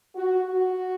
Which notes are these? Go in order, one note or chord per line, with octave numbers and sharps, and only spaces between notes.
F#4
F#4